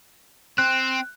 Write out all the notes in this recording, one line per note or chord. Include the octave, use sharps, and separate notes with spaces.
C4 F#6